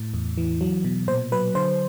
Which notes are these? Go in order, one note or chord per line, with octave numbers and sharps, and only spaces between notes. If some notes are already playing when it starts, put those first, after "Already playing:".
Already playing: A2
E2
E3
F#3
B2
A#2 C5
F#3 B4
D3 C5